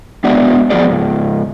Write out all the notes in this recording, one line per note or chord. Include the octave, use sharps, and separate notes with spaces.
G#3 B3 D4 F#4 D5 E5
F3 B3 F#4 G#4 D5
G#2 C#3